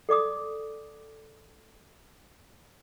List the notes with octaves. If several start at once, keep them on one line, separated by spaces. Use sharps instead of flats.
A4 D5 D6 D#6